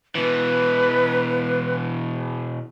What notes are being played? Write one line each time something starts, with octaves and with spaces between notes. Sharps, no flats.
B2 E3 B4